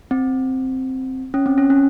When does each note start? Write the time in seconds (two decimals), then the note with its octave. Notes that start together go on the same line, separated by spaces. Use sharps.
0.11 C4
1.34 C#4
1.46 C4
1.58 C#4
1.70 C#4